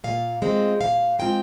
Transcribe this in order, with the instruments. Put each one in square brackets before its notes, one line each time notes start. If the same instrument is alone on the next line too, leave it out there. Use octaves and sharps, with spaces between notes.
[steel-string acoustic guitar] A#2 F5
G#3 C4 F4
A#2 F5
G#3 C4 F4 G5